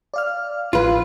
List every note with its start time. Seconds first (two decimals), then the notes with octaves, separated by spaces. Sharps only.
0.14 D5 F5 F6
0.73 A1 F3 F4 B4